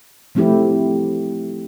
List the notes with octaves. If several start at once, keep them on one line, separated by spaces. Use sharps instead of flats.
F3 A3 C4 E4 G4